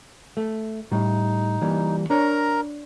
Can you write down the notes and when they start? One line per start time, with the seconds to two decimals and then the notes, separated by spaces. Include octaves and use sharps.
0.37 A3
0.91 A2 G3 D#4
1.62 E3 G3 A#3
2.10 D4 A#4 C#5 A#5